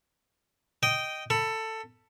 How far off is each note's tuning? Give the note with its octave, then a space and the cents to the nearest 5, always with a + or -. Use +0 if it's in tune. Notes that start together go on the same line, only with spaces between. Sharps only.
D#5 +0 G5 -10
A4 +15 B5 +0